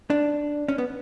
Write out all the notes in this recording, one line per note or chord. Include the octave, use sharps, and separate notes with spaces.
D4
C#4
B3